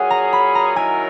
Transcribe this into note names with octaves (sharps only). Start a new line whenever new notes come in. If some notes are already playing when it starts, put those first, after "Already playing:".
Already playing: A#2 F#3 C#4 G#4 F#5 G#5
A#5
B5
A#5
D#3 F#3 C#4 E4 A#4 G#5